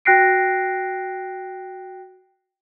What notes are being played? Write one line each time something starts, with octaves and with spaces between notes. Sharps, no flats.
F#4 G5 F#6 A#6 C7 D7